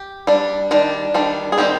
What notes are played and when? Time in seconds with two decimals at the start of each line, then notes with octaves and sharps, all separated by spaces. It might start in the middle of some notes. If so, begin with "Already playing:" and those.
Already playing: G4
0.27 G3 D4
0.71 D#3 G3 D4
1.14 D#3 G3 D4
1.52 G#4
1.58 D#3 G3 C4 G4